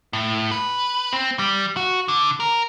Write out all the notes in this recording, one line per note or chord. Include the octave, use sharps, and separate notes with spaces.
A2
B4
C4
G3
F#4
D3
A#4